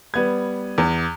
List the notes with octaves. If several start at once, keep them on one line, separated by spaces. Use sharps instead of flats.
G3 B3 G#6
E2